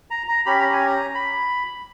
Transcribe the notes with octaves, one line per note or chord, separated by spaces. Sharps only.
A#5
A#5
C#4 G4 B5
A#5
G#5
A#5
B5